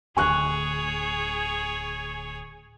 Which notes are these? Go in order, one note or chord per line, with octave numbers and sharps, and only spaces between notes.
D1 D2 G#4 C#5 G#5 C#6 F#6